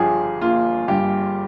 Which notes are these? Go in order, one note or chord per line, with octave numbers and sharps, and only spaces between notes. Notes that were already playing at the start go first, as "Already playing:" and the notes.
Already playing: G1 F3 G4 G#4
A#3 F4
G2 G4